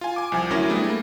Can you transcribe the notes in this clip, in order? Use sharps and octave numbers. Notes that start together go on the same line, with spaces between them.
F4 G#5
G#5 D6
C2 F3 G#5 G#6
D2 F#3 C#4 E4 A#4 A#6
G3 A3 B3 D4 E4 G#4
A3 A#3